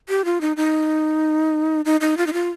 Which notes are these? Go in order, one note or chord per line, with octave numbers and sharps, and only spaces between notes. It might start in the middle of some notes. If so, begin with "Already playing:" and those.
G4
F4
D#4
D#4
D#4
D#4
F4
D#4
F4